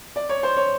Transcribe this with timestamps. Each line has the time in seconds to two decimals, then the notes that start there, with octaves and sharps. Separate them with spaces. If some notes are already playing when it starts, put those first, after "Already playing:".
0.16 D5
0.29 C#5
0.43 C5
0.57 C#5